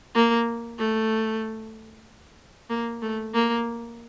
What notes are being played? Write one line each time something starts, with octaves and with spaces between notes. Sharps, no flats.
A#3
A3
A#3
A3
A#3